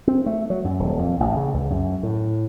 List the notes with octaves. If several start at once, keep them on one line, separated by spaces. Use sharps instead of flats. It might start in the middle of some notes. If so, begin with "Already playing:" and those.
C4
A3
F#3
F#2
D#1
F2
A1
C#3
C#2
F#2
A2